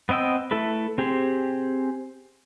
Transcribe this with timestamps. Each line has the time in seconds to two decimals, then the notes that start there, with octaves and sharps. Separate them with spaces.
0.09 B3 C4 D#5 G5 E6
0.51 A3 E4 A4 B4
0.98 C4 G4 G#4 C5